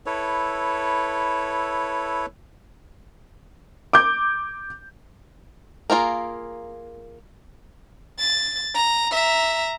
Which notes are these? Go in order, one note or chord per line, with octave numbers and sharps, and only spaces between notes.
E4 A4 B4 C#5
D6 G6
A#3 F4 G#4 A#4
A6
A#5
E5 A#5